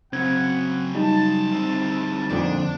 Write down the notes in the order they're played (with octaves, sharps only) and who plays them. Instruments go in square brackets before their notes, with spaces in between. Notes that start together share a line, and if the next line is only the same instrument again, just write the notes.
[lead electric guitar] C#3 F#3 [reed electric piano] C4 G#6 [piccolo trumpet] F#5
[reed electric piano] G3 D#4 [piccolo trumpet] A5
[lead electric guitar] D2 C4
[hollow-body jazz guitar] F2 A#2 D3 [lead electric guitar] D4